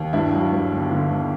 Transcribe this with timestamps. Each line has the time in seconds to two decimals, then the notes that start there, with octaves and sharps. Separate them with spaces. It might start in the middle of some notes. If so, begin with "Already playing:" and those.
Already playing: D#2
0.13 G2 D4 E4
0.32 F#3
0.52 G2
0.72 G1
0.92 D3
1.11 G1